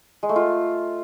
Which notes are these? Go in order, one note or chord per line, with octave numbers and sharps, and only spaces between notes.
G#3
A3
F4